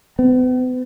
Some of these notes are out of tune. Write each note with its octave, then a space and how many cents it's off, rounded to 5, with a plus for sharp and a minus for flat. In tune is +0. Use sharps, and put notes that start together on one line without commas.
B3 +45